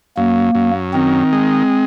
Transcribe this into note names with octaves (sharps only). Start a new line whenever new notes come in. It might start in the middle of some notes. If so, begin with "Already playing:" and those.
F#2 A#3
F#2
D#3 C4
G#3